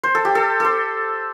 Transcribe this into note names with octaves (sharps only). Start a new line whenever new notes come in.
C5
A4
G4
A4
A4 C5